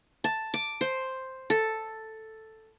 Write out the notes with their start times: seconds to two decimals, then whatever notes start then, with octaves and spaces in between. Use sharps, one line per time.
0.24 A5
0.54 D6
0.81 C5
1.50 A4